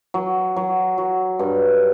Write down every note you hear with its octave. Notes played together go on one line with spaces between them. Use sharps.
F#3
F#3
F#3
G2